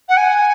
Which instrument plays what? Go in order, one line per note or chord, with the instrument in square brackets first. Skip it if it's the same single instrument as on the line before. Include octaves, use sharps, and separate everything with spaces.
[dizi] F#5
G#5